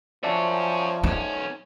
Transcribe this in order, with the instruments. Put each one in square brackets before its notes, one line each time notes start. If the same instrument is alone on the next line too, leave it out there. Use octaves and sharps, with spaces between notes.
[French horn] F3 [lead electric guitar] C#4 F#4 [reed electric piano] D5 E5 A5
[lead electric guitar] B1 C#4 [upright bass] D#4